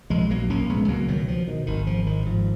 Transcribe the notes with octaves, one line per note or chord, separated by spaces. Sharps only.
A#1 F3 G#3
A#1 F#3 A#3
A#1 A#3 C#4
A#1 G#3 B3
C#2 F#3 A#3
B2 D#3 F#3
B2 F3
B2 D#3
G#1 D#3
G#2 F3
G#1 D#3
G#2 F3